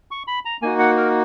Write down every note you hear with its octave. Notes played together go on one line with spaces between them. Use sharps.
C#6
B5
A#5
A#3 D#4 F#4 G#5
F#5
A#4